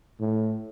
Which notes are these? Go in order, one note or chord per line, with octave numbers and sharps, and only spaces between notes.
A2